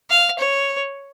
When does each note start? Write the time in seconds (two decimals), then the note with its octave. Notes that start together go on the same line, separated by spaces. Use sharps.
0.10 F5
0.39 C#5